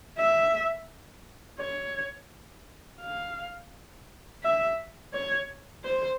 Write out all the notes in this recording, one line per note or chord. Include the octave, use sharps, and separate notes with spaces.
E5
C#5
F5
E5
C#5
C5